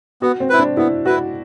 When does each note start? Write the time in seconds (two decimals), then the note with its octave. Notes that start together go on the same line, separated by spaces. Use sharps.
0.22 B3 F#4
0.40 C4
0.49 E4 B4
0.60 D4
0.77 B3 E4
1.06 E4 F#4 B4